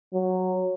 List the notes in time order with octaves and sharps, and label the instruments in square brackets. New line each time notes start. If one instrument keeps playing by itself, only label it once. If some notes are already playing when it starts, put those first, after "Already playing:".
[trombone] F#3